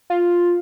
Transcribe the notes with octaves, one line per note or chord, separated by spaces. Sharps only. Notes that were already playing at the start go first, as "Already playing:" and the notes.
F4